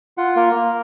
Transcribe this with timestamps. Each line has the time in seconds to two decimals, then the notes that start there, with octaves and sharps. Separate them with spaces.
0.18 F4 F#5
0.36 A#3 A#4
0.55 A#3